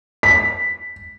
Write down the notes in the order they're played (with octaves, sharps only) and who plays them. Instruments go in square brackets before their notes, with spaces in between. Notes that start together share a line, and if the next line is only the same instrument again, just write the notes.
[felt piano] B6